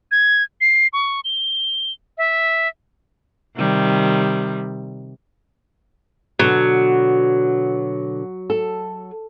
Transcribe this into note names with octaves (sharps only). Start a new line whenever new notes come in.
G#6
C7
C#6
G7
E5
C3 D#3 G3
B2 D3 F#3 B3
A4